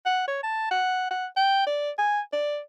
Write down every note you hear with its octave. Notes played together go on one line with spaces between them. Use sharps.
F#5
C#5
A5
F#5
F#5
G5
D5
G#5
D5